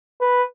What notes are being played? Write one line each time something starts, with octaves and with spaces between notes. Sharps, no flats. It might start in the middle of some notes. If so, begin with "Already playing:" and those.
B4